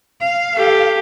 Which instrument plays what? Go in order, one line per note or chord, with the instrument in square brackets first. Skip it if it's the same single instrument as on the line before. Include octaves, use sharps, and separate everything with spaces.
[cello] F5
[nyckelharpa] G4 A4